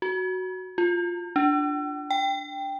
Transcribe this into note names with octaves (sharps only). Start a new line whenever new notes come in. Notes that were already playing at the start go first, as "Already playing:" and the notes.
F#4
F4
D4
G5